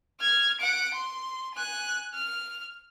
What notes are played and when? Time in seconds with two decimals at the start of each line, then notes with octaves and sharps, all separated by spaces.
0.20 F6 G#6
0.60 F#5 D7
0.95 C6
1.55 G#5 F#6
2.14 F6